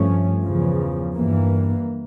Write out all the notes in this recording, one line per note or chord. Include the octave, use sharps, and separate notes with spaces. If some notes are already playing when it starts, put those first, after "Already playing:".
Already playing: G2 F3 A3 C#4
E2 C#3 F3
G2 E3 A#3